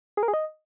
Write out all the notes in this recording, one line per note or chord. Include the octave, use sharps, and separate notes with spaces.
G#4
A#4
G#4
D#5